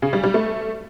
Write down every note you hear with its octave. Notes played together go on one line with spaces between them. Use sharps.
C#3
G3
G3
A3